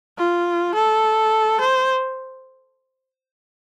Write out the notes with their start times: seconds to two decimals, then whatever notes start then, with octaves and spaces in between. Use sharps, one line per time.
0.18 F4
0.74 A4
1.60 C5